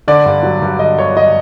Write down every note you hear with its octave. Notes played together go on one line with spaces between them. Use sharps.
D3 D5
G2
F#3
G2
D3 D#5
G2 C#5
F#3 D#5